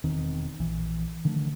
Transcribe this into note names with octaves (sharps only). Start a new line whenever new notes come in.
E1 D#3 C4
A#1 E3
D3 D#3 F3 A3